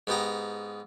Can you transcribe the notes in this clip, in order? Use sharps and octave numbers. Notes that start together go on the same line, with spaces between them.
G#2 B3 G4 A#5